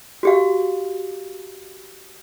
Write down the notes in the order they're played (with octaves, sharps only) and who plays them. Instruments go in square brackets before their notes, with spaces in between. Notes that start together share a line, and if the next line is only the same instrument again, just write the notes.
[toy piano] F#4 G4 F5